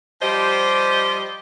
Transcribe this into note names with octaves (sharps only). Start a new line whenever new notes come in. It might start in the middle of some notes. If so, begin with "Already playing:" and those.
F3 G3 G4 C5 D#5